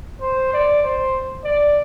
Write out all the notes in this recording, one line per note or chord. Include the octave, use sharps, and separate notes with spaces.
C5
D5
C5
D5